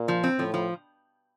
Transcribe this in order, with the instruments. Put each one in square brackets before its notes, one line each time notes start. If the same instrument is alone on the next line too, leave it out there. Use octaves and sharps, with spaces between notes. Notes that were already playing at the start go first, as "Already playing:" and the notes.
Already playing: [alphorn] A#2
[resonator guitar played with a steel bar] F3
C4
[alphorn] A2 [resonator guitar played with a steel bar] F3
[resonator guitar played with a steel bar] F3